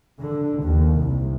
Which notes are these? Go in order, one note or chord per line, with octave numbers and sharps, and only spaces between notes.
D3
D#2
C2